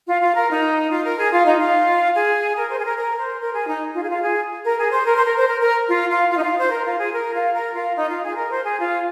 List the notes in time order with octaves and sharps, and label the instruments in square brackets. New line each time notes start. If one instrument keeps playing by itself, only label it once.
[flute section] F4
F4
A#4
D#4
F4
A#4
G#4
F4
D#4
F4
G#4
A#4
C5
G#4
A#4
A#4
C5
A#4
G#4
D#4
F4
G#4
F4
G#4
A#4
G#4
C5
A#4
C5
A#4
C5
A#4
A#4
F4
F4
F4
D#4
F4
C5
A#4
F4
G#4
A#4
F4
A#4
F4
D#4
F4
G#4
A#4
C5
G#4
F4